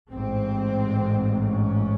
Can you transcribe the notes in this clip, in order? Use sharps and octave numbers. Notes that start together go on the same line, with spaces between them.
A1 G#2 C4
C#4